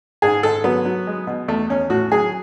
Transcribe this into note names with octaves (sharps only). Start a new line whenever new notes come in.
G#2 G#4
G#2 A4
F#3 B3
F#3
G#3
B2
E2 A3
E2 C#4
A2 F#4
F#3 G#4